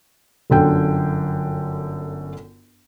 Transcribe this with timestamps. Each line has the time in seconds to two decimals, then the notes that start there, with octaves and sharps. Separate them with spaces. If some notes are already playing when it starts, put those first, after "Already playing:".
0.50 G1 F#2 D3 G5